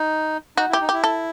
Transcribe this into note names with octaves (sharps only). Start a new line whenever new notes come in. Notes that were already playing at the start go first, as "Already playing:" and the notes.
Already playing: D#4
D#4 F#4
E4
G4
D#4
E4 G4
A4